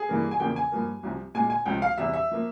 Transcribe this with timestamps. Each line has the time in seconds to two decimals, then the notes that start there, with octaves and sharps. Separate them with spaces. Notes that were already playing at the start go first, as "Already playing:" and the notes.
Already playing: G#4
0.09 G2 E3 G3 A#3
0.31 G#5
0.40 E2 C#3 F3 A#3 G5
0.56 G#5
0.72 G2 F3 A#3
1.03 C2 C3 F3
1.35 A#2 G#3 G#5
1.50 G#5
1.66 C#2 C3 F3 G5
1.82 F5
1.98 E2 C3 G3 E5
2.13 E5
2.31 F3 A#3